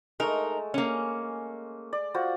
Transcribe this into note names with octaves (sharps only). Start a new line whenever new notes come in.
G#3 A3 D#4 A#4
A#3 C#4
D5
F4 F#4 C5